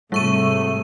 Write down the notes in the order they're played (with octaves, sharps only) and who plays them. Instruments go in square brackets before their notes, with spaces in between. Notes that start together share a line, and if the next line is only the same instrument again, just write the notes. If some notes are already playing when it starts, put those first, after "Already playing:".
[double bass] G#2 C3 [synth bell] G3 C#6 D#7 [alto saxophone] A3